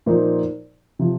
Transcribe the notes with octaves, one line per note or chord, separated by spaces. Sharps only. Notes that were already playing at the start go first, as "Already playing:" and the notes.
A#2 F3 A#3 D#4 C5
C3 F3